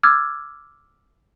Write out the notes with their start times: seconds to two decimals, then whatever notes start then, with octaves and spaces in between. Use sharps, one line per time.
0.03 D6 E6 F6 G#6 A6